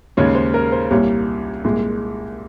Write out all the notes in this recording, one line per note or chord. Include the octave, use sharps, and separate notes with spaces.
D#2 C#3 G#3 C#5
C5
A#4
C5
C2 A#2 G3 A#3 C#5
C2 A#2 G#3